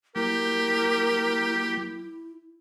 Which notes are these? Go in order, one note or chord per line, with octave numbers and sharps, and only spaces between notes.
F#3 A#3 E4 G4 A#4 G6